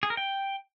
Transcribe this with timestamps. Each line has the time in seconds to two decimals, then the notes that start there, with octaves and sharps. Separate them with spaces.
0.03 G#4
0.10 A#4
0.17 G5